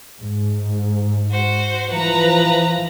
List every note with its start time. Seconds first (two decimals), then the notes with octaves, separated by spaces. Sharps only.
0.20 G#2
1.31 F#4 C5
1.90 E3 F3 B4 A#5